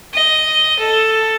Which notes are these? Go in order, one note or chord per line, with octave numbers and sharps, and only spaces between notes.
D#5
A4